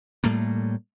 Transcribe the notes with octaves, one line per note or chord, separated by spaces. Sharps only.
A2 G3 A3 A#3